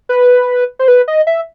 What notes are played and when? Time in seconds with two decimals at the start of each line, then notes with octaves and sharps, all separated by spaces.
0.09 B4
0.79 C5
0.88 B4
1.08 D#5
1.27 E5